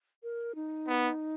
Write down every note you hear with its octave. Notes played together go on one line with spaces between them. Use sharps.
A#4
D#4
B3